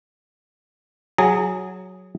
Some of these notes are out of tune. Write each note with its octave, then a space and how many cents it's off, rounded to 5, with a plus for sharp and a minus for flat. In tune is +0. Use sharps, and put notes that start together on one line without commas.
F#3 +0 G#4 +0 A#5 -45